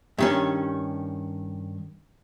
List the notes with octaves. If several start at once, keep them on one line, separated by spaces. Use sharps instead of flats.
G2 D#3 C#4